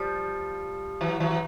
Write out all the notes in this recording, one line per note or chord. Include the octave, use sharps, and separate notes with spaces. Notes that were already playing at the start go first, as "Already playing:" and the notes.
Already playing: F3 G3
E3 F#3
E3 F#3
E3